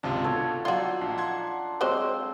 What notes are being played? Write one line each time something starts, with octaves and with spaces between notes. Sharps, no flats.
G#1 C#2 C3 D4 F4
B2 D3 A4 C#5
F#3 D#4 F4 F#4 C#5 D5 G5 C6
A#1 D4
F#5 C6 G#6
F#3 G#3 C4 C5 D5